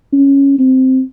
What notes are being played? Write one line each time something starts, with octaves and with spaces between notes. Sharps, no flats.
C#4
C4